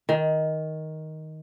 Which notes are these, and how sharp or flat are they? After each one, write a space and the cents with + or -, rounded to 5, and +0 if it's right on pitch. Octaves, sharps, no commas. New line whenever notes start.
D#3 +10